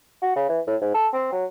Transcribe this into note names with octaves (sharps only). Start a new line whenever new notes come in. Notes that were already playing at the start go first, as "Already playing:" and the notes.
F#4
C#3
E3
A2
G#2
A4
C4
F#3